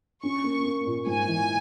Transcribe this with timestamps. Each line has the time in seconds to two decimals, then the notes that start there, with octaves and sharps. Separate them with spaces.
0.23 C#4 C#6
0.44 A#3
0.65 A#3
0.86 A#2
1.07 G#2 G#5
1.28 E3